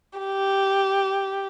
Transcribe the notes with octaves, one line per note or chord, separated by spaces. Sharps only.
G4